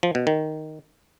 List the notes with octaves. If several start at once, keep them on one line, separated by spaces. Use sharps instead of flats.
F3
B2
D#3